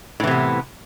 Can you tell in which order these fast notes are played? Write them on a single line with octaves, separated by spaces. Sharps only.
A2 E3 C3 B3